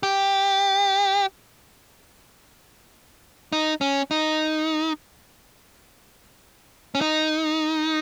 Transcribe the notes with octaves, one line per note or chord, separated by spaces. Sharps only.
G4
D#4
C#4
D#4
C#4
D#4